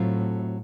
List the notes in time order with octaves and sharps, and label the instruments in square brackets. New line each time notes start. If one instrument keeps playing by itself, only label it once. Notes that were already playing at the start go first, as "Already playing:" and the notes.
Already playing: [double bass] A2 [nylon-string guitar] F#3 A3 C4 F4